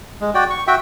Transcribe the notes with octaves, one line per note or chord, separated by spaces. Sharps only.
G#3
F#4 D5 G5
C#6
F#4 E5 G5